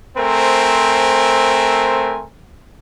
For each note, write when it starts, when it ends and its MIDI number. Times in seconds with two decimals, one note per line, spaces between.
0.17 2.23 57
0.17 2.23 60
0.17 2.23 70
0.17 2.23 72
0.17 2.23 80